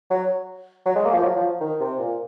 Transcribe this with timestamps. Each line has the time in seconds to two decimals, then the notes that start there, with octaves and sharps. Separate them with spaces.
0.10 F#3
0.86 F#3
0.96 G#3
1.05 A#3
1.14 F3
1.23 F#3
1.36 F3
1.61 D#3
1.80 C3
1.99 A#2